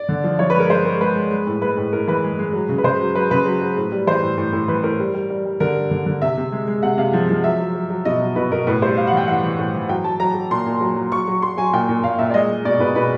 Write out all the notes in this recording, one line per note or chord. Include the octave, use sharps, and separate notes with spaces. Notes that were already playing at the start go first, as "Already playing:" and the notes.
Already playing: D5
D3
F3
F3 C#5
B4
G#3 A#4
G#3 C5
G#3 A#4
G#3 B4
G#3
G#3
A2
G#3 B4
A2
A2 A#4
E3 B4
G#3
G#3
F#3
C#3
B4
C#3 C5
F#3
F#3 B4
C#3 B4
F#3
F#3
A2
G3
E3 C5
A2
A2
A2
E3 B4
A2 A#4
G3
G3
G3
G3
D3 A#4
G3
D3
D3
C3 E5
C3
G#3
G#3
C3 F#5
C3 F5
F3
F3
F#3 E5
F#3
F#3
F#3
B2 D#5
F#3
B2 B4
B2 A#4
A2 B4
G3 C5
G3 F5
F#5
E3 G5
E3 F#5
E3
A2
E3
F#3 G5
F#3 A5
F#3 A#5
F#3
A#2 C6
A#2
F#3
F#3
F#3 C#6
F#3
F#3 C6
F#3 G#5
A#2 G5
A#2
A#2 F5
A#2 E5
D5
G#3 D#5
G#3
B2 D5
B2 B4
B2 B4